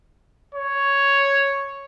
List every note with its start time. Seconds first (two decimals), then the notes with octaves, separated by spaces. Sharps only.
0.55 C#5